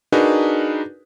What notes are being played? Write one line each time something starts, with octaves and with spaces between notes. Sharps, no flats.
D4 D#4 F#4 G#4 A#4 B4